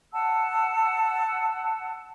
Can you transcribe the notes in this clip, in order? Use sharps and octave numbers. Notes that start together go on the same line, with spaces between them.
F#5 A5 E6